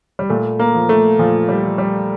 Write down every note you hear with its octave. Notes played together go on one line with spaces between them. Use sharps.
G3
A#2 A3
A#3
F3
A3
A#2 F3
G3
F3
G3